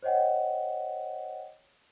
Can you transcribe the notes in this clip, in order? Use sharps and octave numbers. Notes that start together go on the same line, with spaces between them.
C5 C#5 D#5 F#5 G5